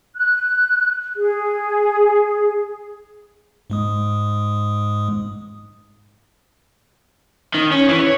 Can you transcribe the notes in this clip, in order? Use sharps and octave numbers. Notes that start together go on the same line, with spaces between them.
F#6
G#4
G#2 G#3 D#6
D#3
C#4
E3
C#5